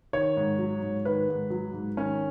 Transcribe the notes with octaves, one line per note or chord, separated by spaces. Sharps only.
D#3 C#5
G#2
F#3
G#2
D#3 B4
G#2
F#3
G#2
D#3 C#4